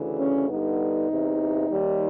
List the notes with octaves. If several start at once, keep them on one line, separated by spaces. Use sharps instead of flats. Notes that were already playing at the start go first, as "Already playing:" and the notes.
Already playing: D2 C#3 E3
C#4
G2 D3 G3 B3 D#4
E2 C3 E3
D#2 D#3 G3